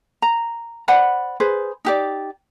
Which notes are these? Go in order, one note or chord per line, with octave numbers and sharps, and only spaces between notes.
A#5
C5 D5 F#5 B5
G#4 B4 C5
D#4 G4 D5